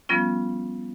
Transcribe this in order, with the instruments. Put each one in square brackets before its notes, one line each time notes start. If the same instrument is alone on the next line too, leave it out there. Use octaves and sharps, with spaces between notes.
[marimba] F3 G3 B3 C#4 F4